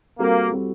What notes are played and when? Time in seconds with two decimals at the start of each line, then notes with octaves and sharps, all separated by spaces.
0.19 G3 A#3 C4 F#4 A4
0.50 G3 C4 F#4 A4